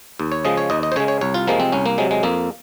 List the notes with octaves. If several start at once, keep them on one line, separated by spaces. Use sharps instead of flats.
D#2
C#5
C#3 F3 G#3 D#5
C#5
D#2 D#5
D#5
C5
C#3 G#3 C#5
C#5
C2 C#5
F4
C3 F3 G#3 A#3
C4
C2 C#4
A#3
C3 F#3 G#3
G#3
F2 A#3